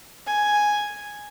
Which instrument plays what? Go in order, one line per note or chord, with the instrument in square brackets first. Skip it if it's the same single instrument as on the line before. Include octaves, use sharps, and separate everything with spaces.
[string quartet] G#5